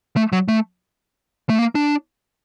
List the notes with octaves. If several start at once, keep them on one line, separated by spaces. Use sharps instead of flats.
A3
F#3
A3
A3
A#3
D4